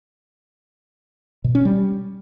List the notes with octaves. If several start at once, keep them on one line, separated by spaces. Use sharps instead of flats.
B2
C#4
G3